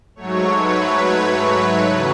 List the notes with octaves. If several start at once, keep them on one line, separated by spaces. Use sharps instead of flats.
G#2 F#3 A3 C#5
B4
E2 C#3 F#3 A3